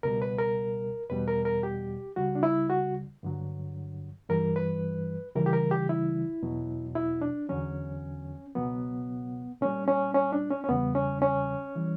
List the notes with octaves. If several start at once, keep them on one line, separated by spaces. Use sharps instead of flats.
C#2 B2 G3 A#4
B4
A#4
E2 B2 G3 B4
A#4
A#4
G4
C#2 C#3 G3 F#4
D4
E4
F#4
G2 D3 F#3
G2 E3 G3 A#4
B4
C#2 C#3 E3 G3 A#4
G4
A#4
G4
E4
E2 B2 F#3
E4
D4
E2 D3 F#3 C#4
C#2 B2 F#3 B3
A#2 G3 C#4
C#4
C#4
D4
C#4
C#4
E2 C#3 G3 B3
C#4
C#4
E3 G3